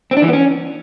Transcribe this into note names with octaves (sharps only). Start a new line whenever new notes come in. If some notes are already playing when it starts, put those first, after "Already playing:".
C4
D4
E3
B3
C#4